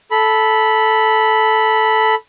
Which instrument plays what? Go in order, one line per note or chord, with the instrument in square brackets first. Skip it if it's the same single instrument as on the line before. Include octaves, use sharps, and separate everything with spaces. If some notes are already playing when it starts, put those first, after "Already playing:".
[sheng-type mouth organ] A4 B5